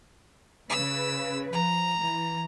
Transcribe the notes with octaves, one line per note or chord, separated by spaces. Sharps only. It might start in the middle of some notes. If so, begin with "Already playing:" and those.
C#3 B4 E6
F3 A#5
E3